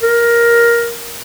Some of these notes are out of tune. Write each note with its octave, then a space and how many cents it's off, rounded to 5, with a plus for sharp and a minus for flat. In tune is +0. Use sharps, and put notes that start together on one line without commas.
A#4 +10